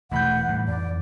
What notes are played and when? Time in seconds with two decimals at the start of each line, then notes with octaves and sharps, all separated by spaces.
0.11 E1 E3 A3 F#5 B5 G6
0.48 A2 G3
0.68 F2 D5